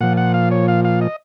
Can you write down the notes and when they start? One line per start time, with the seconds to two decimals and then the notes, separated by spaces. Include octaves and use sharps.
0.01 A#2 F3 F#5
0.17 F#5
0.34 F5
0.51 C#5
0.68 F5
0.85 F5
1.01 D#5